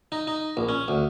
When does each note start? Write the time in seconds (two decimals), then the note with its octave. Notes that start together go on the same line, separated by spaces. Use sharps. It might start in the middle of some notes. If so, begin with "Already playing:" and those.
0.12 D#4
0.27 D#4
0.57 A#1
0.69 C#4
0.88 D2